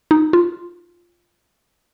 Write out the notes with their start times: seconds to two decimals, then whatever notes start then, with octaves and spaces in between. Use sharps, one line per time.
0.11 D#4
0.33 F4